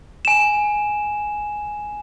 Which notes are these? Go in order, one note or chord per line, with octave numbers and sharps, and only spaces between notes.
G#5 E7